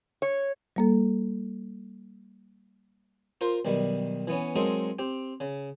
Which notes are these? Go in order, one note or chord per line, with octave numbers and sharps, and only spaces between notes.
C#5
G3 A#3 A4
F4 A#4 C5
B1 D#3 G3
E3 B3 C#4
F#3 G#3 C4 D#4 A4 A#4
C4 G4
C#3